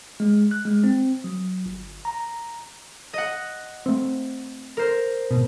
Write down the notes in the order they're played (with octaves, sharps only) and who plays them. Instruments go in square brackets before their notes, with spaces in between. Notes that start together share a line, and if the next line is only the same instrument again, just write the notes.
[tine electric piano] G#3
F#6
G#3
C4
F#3
G1
A#5
[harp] D#5 F#5
[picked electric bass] A3 C4
[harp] A#4 C5
[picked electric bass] G#1 B2